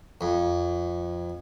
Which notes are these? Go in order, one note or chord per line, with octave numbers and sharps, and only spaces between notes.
F2